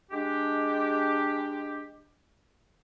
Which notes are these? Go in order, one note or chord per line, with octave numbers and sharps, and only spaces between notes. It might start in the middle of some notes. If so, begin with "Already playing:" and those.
G#3 D4 G4